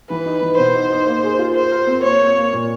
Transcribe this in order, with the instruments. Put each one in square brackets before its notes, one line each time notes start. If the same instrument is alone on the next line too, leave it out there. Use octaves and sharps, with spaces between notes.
[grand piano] E3 [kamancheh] B4
[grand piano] D#4
E3
[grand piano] B2 [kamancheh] C5
[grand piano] D#4
D#4
A#3
G#4
F4
[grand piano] A#4 [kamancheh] C5
[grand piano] A#4
C4
[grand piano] A#3 [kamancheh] C#5
[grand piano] A#3
A#3
A#2